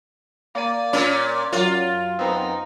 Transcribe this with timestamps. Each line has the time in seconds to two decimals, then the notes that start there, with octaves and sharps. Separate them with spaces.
0.55 A#3 D5 D#7
0.93 A#2 C#4
1.52 F#2 F#3 F4
2.19 F#2 B3 C4 D#4